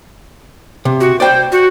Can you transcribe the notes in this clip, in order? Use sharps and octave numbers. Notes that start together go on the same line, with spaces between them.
C3
F#4
C5 D5 G5
F#4